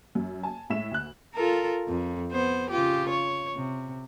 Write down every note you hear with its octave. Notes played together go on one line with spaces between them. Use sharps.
F#2
G#5 A5
A2 G#3 E5 E7
D2 F#6
F4 A4 A#4
F2
B3 C5
C#3 F4 G4
C#5
C3